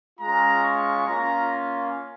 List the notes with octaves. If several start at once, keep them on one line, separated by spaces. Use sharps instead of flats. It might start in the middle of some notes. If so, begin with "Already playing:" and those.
G#3 C#4 F4 A#5
C#6
A#3 C#4 F4 A#5